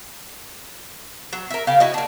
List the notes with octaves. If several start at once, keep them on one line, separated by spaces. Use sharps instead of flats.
F#3
A#4 E5
C#3 F5 G5
E4 F#4 D#5
A#3 D4